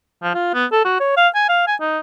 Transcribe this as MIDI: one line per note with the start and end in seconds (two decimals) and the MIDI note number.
0.22 0.32 53
0.34 0.52 65
0.54 0.66 59
0.72 0.80 69
0.85 0.96 66
1.00 1.16 73
1.17 1.28 77
1.35 1.45 80
1.49 1.64 77
1.67 1.75 80
1.81 1.99 63